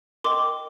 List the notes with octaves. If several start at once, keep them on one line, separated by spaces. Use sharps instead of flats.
A#4 D#5 G5 C6 D6